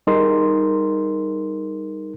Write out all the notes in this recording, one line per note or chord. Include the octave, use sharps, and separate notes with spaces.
G3 D#4 G#4 A#4 C6